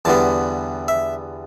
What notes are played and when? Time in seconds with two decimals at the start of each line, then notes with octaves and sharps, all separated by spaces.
0.05 E2 D3 G3 B3 A5
0.88 E5